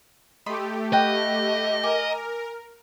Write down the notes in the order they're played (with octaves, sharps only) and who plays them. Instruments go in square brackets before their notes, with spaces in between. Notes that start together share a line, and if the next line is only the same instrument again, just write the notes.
[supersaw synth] A3 G4 [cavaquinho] D#5 B5 C6
[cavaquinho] F#4 B4 G5 [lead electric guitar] D#5
[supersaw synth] A#4 [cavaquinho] G#5 D6